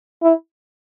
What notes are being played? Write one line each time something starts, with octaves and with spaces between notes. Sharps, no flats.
E4